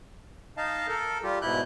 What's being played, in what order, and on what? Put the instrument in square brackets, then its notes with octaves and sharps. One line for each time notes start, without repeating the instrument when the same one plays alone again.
[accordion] D#4 D#5 F5 A5
A4 A#4
G3 F4 G4
G#2 B2 E4 F#6 G6